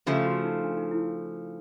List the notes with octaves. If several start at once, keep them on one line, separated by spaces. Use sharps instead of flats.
C#3 F3 A3 G4
F#4
D#4
D4
D#4
E4